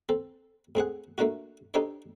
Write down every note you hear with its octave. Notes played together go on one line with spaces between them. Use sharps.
C4 A4
A2 C4 G#4 F#5
A3 A#3 D4 F4 F#4
D4 D#4 G4 A4 C5 C#5